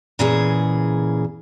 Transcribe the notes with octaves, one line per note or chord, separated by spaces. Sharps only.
A#2 C#3 E3 G#4